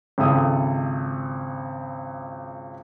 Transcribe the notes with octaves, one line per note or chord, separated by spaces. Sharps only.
G#1 C#2 E4 A4 D#6